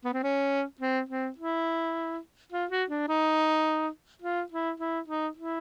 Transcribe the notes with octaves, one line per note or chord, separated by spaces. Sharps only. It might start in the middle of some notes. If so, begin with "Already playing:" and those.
B3
C4
C#4
C4
C4
E4
F4
F#4
D4
D#4
F4
E4
E4
D#4
E4